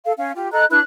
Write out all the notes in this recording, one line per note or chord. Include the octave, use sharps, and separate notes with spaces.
A4 F5
C#4 F5
F4 G4
A4 D#5 A#5 F#6
D4 E4 B4 F#6